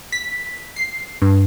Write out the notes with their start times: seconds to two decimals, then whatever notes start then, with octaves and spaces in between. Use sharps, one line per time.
0.12 B6
0.76 C7
1.22 G2